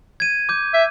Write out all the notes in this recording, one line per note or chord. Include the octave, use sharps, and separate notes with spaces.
G#6 D#7
D6 G6
E5